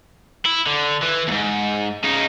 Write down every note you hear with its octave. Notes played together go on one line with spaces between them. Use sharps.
E4
D3
E3
D#2 G#2
C#3 D#4